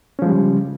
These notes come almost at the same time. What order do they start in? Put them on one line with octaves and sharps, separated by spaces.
C#4 F3 G#3 G3 C#3